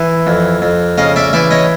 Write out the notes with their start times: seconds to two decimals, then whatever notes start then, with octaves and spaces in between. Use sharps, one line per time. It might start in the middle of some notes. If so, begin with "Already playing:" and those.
Already playing: E3
0.27 F2
0.62 F2
0.98 C#3 D#5 F5
1.16 D5 E5
1.33 E3 D5 E5
1.51 C#5 D#5